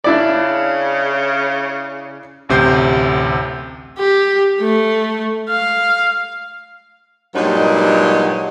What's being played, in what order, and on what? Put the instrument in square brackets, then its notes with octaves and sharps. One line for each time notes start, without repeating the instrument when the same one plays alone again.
[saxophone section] C#3 [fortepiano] D4 E4 D5
[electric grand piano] A1 D2 C3 E6 G6 C7
[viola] G4
A3
F5
[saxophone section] G2 A#2 F#3 G#3 D4 D#4